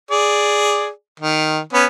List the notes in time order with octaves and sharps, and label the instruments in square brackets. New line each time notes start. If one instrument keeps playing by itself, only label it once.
[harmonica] G#4 D5
D#3
B3 C#4